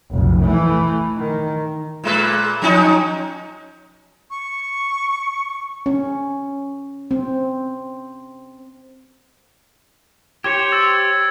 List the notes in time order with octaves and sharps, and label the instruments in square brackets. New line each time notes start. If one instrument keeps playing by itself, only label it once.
[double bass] F1 B1
E3 A3
D#3
[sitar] A#2 G#3 B4
F3 C#4 D#4
[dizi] C#6
[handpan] C#4
C4
[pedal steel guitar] G4 C5 C#5 [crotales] G#6 C#7
[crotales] E6 A6